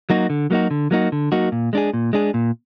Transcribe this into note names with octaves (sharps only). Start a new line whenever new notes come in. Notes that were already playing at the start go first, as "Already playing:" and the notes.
F#3 A#3 D#4 F#4
D3
F#3 A#3 D#4 F#4
D3
F#3 A#3 D#4 F#4
D3
F#3 A#3 D#4 F#4
A#2
G#3 D4 G#4
A#2
G#3 D4 G#4
A#2